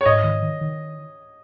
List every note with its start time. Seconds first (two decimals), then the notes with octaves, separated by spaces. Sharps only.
0.01 C#5
0.06 G#2 D#5
0.24 D#3
0.42 D#3
0.61 D#3